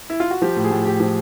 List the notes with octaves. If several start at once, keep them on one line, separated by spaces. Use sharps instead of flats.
E4
F4
F#4
F3 G4
A2
G#4
A2
A2 G4
F3